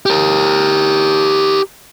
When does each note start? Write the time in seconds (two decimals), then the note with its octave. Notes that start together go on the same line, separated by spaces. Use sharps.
0.06 G4 A#4